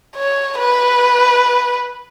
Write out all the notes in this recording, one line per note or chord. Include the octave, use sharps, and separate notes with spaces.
C#5
B4